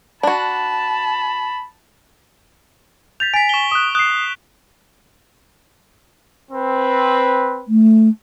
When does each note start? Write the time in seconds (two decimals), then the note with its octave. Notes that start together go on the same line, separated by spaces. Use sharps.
0.23 D4 F#4 A5 B5
3.20 G6 A6 B6 F7
3.34 G#5 A6 B6 D7
3.49 C#6 G7
3.72 D#6 F#6
3.95 D#6 F#6 C7
6.51 C4 B4
7.68 A3